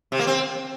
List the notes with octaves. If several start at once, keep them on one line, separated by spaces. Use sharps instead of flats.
C3
A#3
C4